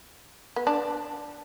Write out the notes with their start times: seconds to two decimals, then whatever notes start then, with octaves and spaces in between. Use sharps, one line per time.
0.56 B3
0.67 D4